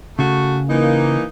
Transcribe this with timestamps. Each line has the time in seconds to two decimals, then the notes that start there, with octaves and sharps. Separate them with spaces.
0.19 C#3 A3 F#4
0.69 E3 A#3 D#4